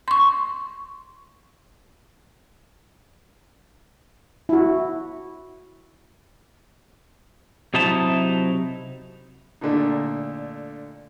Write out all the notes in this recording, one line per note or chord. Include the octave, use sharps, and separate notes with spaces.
C6 C#6
E4 F#4
C3 F#3 D#4 E4 A5
A#2 D3 A3 D4 D#4